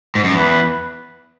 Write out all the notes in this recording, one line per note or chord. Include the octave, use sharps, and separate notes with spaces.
G#2
F#2
E2 B4